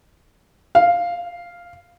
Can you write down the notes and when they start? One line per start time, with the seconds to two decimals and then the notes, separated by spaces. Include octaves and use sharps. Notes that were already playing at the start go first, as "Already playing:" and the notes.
0.75 F5